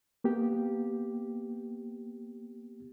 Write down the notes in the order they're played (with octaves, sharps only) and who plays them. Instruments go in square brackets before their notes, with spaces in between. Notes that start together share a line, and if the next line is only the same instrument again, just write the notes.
[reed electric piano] A#3 B3 G4